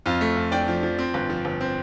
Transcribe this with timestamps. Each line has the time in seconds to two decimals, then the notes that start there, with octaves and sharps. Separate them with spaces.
0.06 F2 F4
0.21 A3
0.37 F2
0.52 D4 D5 G5
0.68 F3
0.83 F3
0.99 C4
1.14 G1
1.30 F3
1.45 G1
1.61 C4